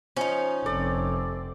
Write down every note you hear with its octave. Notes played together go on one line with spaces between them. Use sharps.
F3 C#4 D#4
F1 C4 A4 D5